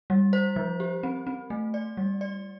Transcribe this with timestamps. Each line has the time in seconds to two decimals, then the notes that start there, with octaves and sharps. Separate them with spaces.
0.10 G3
0.33 C5
0.56 F3
0.80 G4
1.03 C4
1.27 C4
1.50 A3
1.74 D5
1.97 G3
2.21 D5